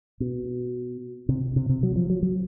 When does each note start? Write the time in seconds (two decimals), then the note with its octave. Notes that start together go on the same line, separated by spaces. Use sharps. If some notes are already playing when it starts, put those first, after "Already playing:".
0.20 B2
1.29 C3
1.56 C3
1.69 C3
1.83 F#3
1.96 F3
2.10 F#3
2.23 F#3